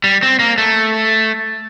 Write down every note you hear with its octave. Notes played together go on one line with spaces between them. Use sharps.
G3
C4
A#3
A3